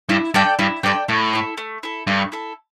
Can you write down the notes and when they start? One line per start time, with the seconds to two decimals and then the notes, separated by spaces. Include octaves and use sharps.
0.09 G2 E4
0.34 G2 A4 D5 G5
0.59 G2 E4
0.83 G2 A4 D5 G5
1.08 A2 A3
1.33 E4 A4
1.58 A3
1.83 E4 A4
2.07 G2 A3
2.32 E4 A4